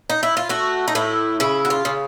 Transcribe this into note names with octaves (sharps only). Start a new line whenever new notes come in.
D#4
E4
F4
A3 F#4
D#4
A2 E4
C#3 E4
F#4
F4
C#3